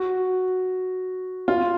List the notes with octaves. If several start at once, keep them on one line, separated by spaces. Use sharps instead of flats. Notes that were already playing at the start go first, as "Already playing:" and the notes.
Already playing: F#4
F4